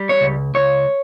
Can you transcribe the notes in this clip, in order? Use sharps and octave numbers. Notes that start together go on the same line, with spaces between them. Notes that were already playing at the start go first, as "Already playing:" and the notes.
Already playing: G3
C#5
C#2
C#2 C#5